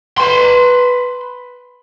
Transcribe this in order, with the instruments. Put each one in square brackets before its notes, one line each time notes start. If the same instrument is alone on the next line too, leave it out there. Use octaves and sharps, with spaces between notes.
[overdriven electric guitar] B4 C6